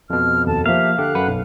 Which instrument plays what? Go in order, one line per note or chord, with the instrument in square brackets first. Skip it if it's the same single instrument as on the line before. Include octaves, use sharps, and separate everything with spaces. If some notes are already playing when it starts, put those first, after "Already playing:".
[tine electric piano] F2 B2 [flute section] F6
[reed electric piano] D#2 [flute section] A4 A5
[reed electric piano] F3 A#3 [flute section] G4 E5 [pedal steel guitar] F5
[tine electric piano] D3 G4 [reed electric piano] A4 [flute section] F#6
[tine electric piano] F#2 B4 F#5
B1